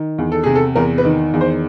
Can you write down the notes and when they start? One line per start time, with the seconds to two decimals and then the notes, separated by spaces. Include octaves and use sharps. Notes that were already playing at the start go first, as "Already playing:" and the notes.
Already playing: D#3
0.18 E2
0.32 A4
0.44 C3 G#4
0.55 A4
0.75 E2 A#4
0.98 B4
1.05 D#3
1.34 E2
1.41 C5